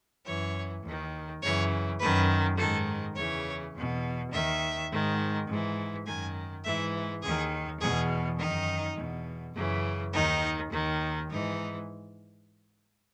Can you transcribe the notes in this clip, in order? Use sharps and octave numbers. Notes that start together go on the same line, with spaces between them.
F#2 E3 C#5
D#2 D#3
F#2 C#3 E3 C#5
F#2 D#3 B4
G#2 D#3 A4
E2 C#3 E3 C#5
E2 B2
D#2 D#3 E5
G#2 D#3
G#2 E3
F#2 D#3 G#5
G#2 E3 E5
D#2 D#3 G#4
E2 B2 G#4
F#2 D#3 D#4
E2 B2
F#2 C#3 E3
D#2 D#3 D#4
D#2 D#3
G#2 E3 D#4